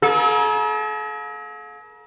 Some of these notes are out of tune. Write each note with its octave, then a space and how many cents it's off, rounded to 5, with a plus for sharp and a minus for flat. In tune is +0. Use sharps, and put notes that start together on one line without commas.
A#3 +35 A4 -45